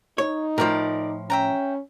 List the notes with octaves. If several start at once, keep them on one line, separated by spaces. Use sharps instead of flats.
D#4 C#5
A2 F3 A#4 D5
C#4 E5 G5 A#5